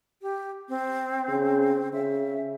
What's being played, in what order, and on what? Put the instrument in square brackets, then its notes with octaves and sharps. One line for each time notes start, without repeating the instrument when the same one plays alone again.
[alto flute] G4
C4
[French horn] C#3
[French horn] C#3 [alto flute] E5